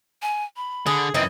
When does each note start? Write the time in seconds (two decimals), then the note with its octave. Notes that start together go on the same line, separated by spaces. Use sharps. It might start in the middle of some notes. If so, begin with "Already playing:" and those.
0.22 G#5
0.56 B5
0.86 D3 G#4
1.14 F#2 E3 C4 D#4 D#5